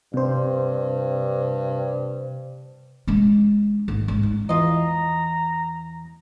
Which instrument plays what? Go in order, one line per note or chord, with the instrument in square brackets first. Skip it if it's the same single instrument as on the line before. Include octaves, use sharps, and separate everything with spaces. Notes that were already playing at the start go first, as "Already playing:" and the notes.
[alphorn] G2 [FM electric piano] C3 C5
[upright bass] G#3 D4
G#1
G#2
D#4
[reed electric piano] E2 E3 [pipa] F4 D#5 [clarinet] A#5